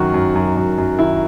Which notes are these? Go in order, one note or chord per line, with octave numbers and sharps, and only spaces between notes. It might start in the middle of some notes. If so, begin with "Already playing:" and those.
Already playing: F#2 D#3 F#4
F#2
F#2
F#2
F#2
D#3 E4